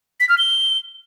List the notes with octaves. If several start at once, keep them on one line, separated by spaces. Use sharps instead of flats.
B6
F6
G7